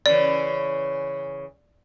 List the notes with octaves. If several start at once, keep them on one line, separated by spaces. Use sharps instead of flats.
C#3 E3 D5